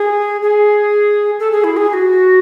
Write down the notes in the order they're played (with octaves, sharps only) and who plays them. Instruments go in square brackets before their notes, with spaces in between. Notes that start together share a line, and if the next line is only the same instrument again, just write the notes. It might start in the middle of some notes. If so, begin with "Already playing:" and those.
Already playing: [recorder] G#4
G#4
A4
G#4
E4
G#4
G#4
F#4